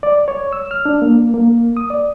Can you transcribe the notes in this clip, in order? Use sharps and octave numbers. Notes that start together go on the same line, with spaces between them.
D5
C#5
E6
F6
D4
A#3
A#3
D#6
D5